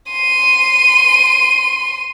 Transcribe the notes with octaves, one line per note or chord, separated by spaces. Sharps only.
C6 D#7